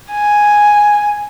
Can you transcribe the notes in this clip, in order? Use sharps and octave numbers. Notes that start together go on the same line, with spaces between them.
G#5